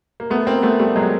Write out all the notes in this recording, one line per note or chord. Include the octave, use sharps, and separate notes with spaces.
A#3
A3 B3
A#3 C4
A3 B3
G3 A3
F#3 G#3